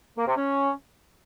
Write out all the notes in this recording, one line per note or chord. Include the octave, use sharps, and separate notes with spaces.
A#3
C3
C#4